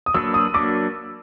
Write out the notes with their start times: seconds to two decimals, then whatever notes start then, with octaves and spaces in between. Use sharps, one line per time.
0.06 D#6
0.14 F#3 A#3 D4 F#4 B4 E6
0.34 D#6
0.54 F#3 A#3 D4 F#4 B4 D6